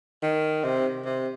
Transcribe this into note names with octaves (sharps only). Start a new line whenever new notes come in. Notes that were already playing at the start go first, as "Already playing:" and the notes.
D#3
C3
C3